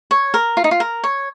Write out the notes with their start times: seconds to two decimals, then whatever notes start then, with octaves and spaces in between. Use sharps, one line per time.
0.11 C#5
0.34 A#4
0.57 F4
0.64 D#4
0.71 F4
0.80 A#4
1.04 C#5